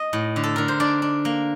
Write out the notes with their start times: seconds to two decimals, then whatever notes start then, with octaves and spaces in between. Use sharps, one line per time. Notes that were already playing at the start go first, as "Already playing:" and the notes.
Already playing: D#5
0.13 A2
0.36 D3
0.44 A4
0.56 D3 A#4
0.68 C5
0.80 D4 D5
1.02 D4
1.25 A#3